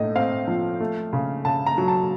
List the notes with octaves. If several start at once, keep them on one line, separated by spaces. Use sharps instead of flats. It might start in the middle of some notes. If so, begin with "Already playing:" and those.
Already playing: A2 A3 D#5
C4 F5
F3
A3
C#3
C#3 A5
A#5
F#3
A5